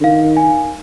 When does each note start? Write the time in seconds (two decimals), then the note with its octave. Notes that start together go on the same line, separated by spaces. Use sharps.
0.01 D3
0.04 D#3 F5
0.37 G#5